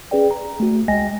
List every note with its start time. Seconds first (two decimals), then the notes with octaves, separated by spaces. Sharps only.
0.11 C#4 G#4 B4 D5 G5
0.31 A#5
0.60 A3 F#4
0.88 C2 G#3 D#5 G5 G#5 A#6